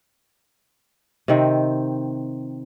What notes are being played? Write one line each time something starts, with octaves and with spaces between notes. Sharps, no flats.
C3 D#3 C4